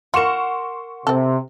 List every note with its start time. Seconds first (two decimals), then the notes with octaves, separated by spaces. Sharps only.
0.14 F4 A#4 F#5 C6 C#6 E7
1.07 C3 C4 A4